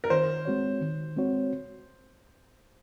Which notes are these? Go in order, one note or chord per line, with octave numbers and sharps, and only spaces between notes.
A#4
D#3 C5
G#3 C4 F#4 C#5
D#3
G#3 C4 F#4 C#5